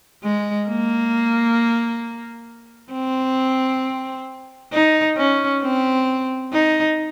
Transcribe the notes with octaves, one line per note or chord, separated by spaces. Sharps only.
G#3
A#3
C4
D#4
C#4
C4
D#4